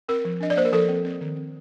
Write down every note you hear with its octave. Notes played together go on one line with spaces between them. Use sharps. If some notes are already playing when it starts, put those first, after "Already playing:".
C4 A#4
F3
D4 D#5
D5
A#3 C5
A#4
F3 A4
C4
C4
D#3
C4